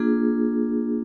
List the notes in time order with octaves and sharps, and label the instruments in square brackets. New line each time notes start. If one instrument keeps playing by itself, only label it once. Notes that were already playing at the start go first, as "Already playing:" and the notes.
Already playing: [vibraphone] A#3 D4 F4 G#4